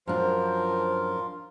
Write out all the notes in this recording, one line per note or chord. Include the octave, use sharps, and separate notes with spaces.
F#2 F3 D4 F4 A#4 C5